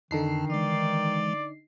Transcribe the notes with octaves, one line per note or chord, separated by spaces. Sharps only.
F2 D3 D#3 D#4 A5 C7
E3 G#3 D5